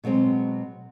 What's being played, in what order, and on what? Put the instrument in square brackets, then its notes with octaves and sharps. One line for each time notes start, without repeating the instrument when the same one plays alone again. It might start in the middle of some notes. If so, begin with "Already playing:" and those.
[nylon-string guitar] B2 F#3 G#3 C4